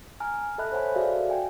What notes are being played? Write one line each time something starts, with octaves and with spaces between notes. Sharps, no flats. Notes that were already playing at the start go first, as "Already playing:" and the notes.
G#5 A#5 F6
A4 D#5 E5 A5 B5 F#6
C5 C#5 F#5 G#5 B5
F#4 G#4 A4 D5 E5 F5
G5 G#5